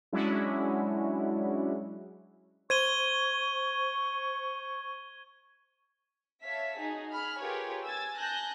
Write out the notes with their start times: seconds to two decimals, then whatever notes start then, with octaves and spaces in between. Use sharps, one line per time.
0.12 F#3 G#3 C#4 D4 E4 F#4
2.70 C5 C#6 G#6 D#7 G7
6.42 C#5 E5 F5 A5 B6
6.78 D#4 F#4 G#4
7.11 G#4 B5 F6
7.40 F4 G4 G#4 A#4 B4 C#5
7.83 G#5 E6 G#6 A6
8.16 G#5 A5 F#6 G6 A#6